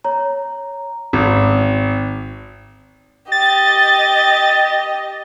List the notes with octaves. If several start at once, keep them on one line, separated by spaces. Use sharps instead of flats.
C#5 A#5
G#1
G4 D#5 A6